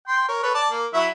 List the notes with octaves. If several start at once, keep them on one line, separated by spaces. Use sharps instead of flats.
G5 C6
A#4 C#5
A4 B4 C#5
D5 A5
A#3
F#3 E4 E5